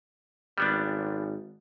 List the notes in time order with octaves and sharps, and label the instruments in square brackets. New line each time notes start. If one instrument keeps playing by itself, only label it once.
[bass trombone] G#1 [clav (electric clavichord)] G3 B3 D4